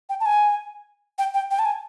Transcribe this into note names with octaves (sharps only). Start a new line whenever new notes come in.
G5
A5
G#5
G5
G5
G5
A5
G#5